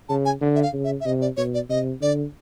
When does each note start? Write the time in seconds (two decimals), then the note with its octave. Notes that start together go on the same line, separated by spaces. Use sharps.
0.09 C#3 A5
0.25 G#5
0.41 D3
0.55 E5
0.62 F5
0.73 C#3
0.84 E5
1.00 E5
1.05 C3 D#5
1.21 D5
1.37 B2 C#5
1.54 D5
1.69 C3 D#5
2.01 D3 D5